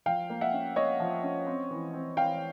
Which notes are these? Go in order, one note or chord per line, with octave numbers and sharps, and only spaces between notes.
F3 F5 G5
A#3
E5 F#5
C#4
A#3 C#5 D#5
F3
C#4
C4
E3
C4
E3 F5 G5